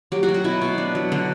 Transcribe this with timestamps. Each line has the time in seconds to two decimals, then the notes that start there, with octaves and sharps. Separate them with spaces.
0.12 F#3 G4
0.23 F#4
0.29 F#3
0.34 F#4
0.44 B2 E4
0.62 B2
0.78 D4
0.95 F#3
1.12 D3